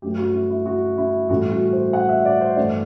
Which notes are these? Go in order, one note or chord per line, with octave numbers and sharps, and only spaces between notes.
G2 F#3 A3 G4
F#4
E4
E4
F#4
E4
A2 E3 G3 F#4
F#4
C5
F#5
E5
D5
C5
G2 E3 A3 D5